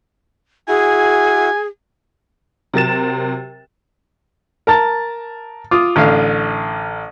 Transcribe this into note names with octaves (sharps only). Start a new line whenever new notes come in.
E4 F#4 G#4 G#5
C3 F#3 A#4 A6 E7
A#4 A5 A6
F4 D6 D#6
A1 D3 F5